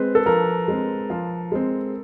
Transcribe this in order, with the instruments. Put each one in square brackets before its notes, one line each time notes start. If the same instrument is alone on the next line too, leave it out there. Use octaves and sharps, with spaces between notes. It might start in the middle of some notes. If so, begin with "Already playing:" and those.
Already playing: [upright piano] G#3 C4 [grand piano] B4
[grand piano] A4
[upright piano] F3 [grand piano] A#4
[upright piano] G#3 C4
F3
G#3 C4